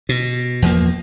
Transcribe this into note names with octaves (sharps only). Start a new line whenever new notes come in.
B2
E2 F3 A#3